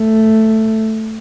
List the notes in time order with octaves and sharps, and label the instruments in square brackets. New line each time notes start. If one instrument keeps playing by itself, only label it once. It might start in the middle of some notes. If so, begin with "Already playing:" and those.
Already playing: [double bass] A3